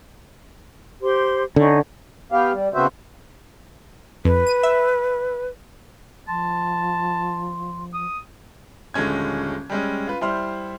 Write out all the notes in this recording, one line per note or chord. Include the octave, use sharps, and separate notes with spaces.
G4 C5 C6
D3 C#4 D#4
B3 G4 F5
G3
C#3 B3 C4 F#4 C5 E5
F2 B4
D#7
E5
F3 A5 C6
D#6
D#1 D3 G#3 C#4 G#6
G3 G#3 C#4
F4 B4
G3 E4 C5 C6 F6